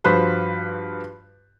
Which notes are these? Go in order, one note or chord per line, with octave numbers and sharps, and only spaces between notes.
G2 F3 F#4 B4 C5 B5